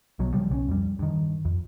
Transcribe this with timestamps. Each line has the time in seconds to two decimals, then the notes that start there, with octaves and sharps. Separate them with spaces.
0.19 B1 B2 F#3
0.33 C#3 F3 G3
0.49 B1 G3 C#4
0.68 F2 G3
0.99 G2 D#3
1.45 F2